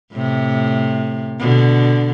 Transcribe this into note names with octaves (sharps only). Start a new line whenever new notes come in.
A2 C3
B2 D3